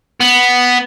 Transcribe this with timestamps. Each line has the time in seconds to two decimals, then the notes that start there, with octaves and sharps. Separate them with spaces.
0.20 B3